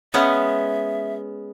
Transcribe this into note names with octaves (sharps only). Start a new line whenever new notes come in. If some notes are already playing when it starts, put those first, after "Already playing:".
G#3 B3 C#4 E5